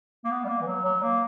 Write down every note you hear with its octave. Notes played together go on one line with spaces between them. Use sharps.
A#3
B3
G3
A#3
E3
F#3
F#3
A#3